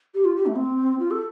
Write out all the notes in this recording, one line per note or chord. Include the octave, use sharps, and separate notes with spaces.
G4
F4
G4
A3
C4
F4
A4